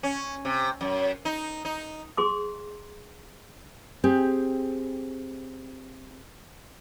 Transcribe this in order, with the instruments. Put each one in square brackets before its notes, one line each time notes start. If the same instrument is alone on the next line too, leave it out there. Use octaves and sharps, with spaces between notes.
[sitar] C#4
C3
F#2
D#4
D#4
[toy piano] G#4 C6 D6
[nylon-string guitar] C4 G4 G#4